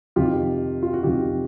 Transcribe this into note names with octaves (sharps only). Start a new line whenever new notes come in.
F2 C3 D#3 F4 G4
F4
F#4
F2 C3 D#3 F4 G4